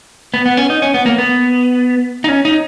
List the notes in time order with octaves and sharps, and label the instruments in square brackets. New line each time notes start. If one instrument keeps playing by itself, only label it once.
[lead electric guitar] B3
B3
C#4
D#4
C#4
B3
A#3
B3
D#4
C#4
D#4